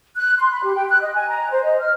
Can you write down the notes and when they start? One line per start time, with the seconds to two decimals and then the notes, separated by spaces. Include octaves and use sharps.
0.17 F#6
0.39 C6
0.51 B5
0.63 G4
0.75 G5
0.88 F#6
1.01 D#5
1.14 G#5
1.29 A#5
1.51 C5
1.63 D#5
1.79 F6